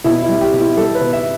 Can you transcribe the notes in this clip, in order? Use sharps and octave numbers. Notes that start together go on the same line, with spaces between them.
B2 E4
E4
G3
G4
B2
E4
G3 A4
B4
B2
E5